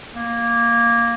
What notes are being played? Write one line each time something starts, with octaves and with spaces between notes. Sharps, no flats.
A#3